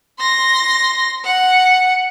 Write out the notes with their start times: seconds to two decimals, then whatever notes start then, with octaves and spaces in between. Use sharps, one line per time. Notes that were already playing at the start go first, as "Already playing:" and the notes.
0.20 C6 A#6
1.25 F#5